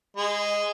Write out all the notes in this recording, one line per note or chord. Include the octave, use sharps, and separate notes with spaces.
G#3